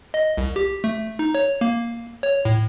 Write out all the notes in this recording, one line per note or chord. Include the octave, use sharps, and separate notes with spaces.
D#5
C2
G4
A3
D#4
C#5
A#3
C#5
A2